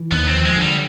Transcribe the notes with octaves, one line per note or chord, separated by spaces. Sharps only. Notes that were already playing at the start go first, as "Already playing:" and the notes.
Already playing: E3
D#2 B3
C4
F3
G#3
D3 G3